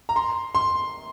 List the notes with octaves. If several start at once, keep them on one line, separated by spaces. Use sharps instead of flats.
A#5
C6
C6